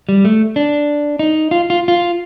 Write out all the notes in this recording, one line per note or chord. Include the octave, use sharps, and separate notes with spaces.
G3
A3
D4
D#4
F4
F4
F4